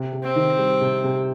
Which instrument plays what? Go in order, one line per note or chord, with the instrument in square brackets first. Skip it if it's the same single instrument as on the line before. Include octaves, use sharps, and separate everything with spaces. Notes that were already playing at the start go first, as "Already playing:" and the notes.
Already playing: [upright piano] C3
C3
[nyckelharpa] C4
[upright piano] D#3
G3
C3
C3